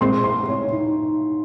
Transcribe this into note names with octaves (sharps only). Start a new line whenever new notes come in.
A#2 G#3 C4 C6
C6
C#5
D#4